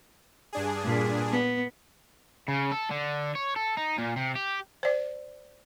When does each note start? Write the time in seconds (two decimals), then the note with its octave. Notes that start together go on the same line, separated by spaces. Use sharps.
0.53 G2 D4 G#4
0.85 A#2
1.31 B3
2.48 C#3
2.71 A4
2.91 D3
3.35 C#5
3.56 A4
3.77 D#4
3.98 A#2
4.16 C3
4.36 G4
4.83 C5 D5